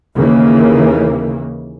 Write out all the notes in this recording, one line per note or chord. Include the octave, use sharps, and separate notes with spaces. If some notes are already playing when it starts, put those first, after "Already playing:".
D#2 C#3 E3 A#3